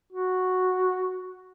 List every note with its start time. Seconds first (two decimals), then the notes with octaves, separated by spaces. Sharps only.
0.12 F#4